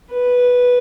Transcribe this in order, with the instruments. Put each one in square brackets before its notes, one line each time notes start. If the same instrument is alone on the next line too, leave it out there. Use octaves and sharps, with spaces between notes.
[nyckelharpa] B4